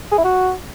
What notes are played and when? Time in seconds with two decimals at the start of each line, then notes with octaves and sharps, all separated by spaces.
0.12 G#4
0.18 E4
0.24 F#4